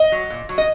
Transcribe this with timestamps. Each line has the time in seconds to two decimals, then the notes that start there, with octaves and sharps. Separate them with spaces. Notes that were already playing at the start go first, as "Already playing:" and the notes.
Already playing: D#5
0.12 F#3
0.30 A#2
0.49 F#3
0.58 D#5